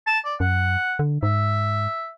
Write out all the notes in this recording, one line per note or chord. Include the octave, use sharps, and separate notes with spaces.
A5
D5
F#2 F#5
D3
G#2 E5